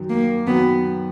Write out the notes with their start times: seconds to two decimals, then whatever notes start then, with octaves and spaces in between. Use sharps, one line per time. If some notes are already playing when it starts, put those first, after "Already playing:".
Already playing: F#2 D#3 F#3
0.10 A#3
0.47 F#2 D#3 F#3 B3